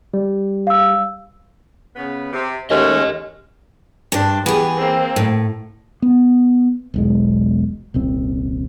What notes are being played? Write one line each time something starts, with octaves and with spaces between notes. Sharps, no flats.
G3
F5 E6
C#3 B3
C3
D#2 G#3 A3 C#4 F#4 G4 D#5
G2 D4 C5
E3 B3 G4 G#4
A#3 C4
A2
B3
E1 B1 G#3
D#1 C2 C4